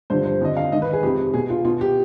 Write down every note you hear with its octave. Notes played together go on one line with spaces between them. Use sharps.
G2 D3 F3 C5
C5
F2 D3 F3 D#5
F5
G#2 D#3 D#5
B4
G#4
F2 C3 F3 G4
B2 G#4
F4
B2 F4
G4